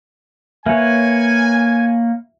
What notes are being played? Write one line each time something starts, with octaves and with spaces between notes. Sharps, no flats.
A#3 B4 C#5 E5 G#5